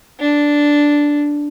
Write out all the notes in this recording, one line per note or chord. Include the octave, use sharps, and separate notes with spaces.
D4